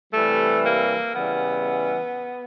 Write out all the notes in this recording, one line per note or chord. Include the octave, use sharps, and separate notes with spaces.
C3 E3 G3 A3
A#3
C#3 E3 G3 B3